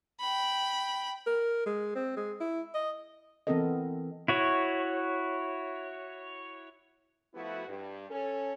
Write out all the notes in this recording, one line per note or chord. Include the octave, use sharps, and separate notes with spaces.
G5 B5
A#4
G#3
C4
G#3
E4
D#5
E3 B3 C4 A4 A#4 D#5
E4 F#4 C#5
F3 A3 B3 E4 F#4
G2
C#4 A4